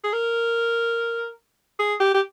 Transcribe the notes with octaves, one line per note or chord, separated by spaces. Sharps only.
G#4
A#4
G#4
G4
G4